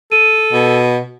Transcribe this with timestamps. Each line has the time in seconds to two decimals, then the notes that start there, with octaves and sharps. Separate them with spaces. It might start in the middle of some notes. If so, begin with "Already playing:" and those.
0.12 A4 D#7
0.53 B2